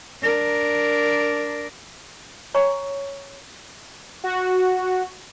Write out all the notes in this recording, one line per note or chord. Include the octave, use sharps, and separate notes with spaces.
D4 A#4
C#5 G#5 A#5 C#6
F#4